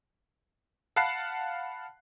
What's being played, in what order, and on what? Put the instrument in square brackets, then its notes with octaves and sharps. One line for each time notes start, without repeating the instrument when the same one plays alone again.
[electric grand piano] F5 F#5 A5 B5 F#6 C7